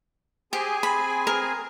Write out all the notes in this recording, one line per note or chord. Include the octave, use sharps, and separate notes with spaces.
C4 G4 G#4 G#5
B5
A#4